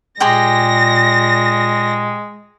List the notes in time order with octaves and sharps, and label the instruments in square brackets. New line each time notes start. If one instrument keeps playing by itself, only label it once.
[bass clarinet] A#2 [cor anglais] G#3 [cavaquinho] G4 G#4 C6 [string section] A#6